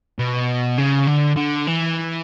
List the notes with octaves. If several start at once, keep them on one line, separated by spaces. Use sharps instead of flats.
B2
C#3
D3
D3
E3